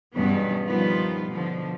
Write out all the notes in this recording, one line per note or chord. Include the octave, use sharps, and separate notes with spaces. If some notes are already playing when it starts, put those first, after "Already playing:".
E2 G2 B2 B3 C#4
D#3 F3 G3 B3 D#4 F4
B2 D3 F3